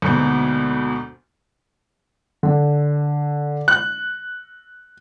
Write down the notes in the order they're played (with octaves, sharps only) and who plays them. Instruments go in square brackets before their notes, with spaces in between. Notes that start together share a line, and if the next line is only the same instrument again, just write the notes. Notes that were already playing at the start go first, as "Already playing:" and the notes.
[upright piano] D2 G#2 B2 A#3 B3 G6
D3
F#6